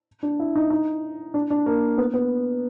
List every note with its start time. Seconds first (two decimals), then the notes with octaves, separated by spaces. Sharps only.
0.23 D4
0.39 E4
0.56 D#4
0.70 D#4
1.34 D4
1.50 D4
1.66 A#3
1.98 B3
2.14 B3